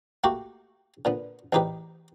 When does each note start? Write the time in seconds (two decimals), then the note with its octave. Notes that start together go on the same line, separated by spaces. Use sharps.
0.24 A3 A#3 F#4 G4
1.05 A#2 D3 B3
1.53 A1 E2 D#4 G4 B4